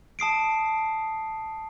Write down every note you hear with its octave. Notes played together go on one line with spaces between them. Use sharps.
A5 D#6 C7 D7